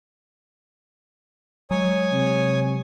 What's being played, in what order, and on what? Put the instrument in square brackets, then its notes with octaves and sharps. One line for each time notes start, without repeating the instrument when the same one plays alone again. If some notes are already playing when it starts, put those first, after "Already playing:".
[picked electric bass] F#3 G#3 [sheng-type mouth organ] C#5 G#5 D#6
[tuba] C3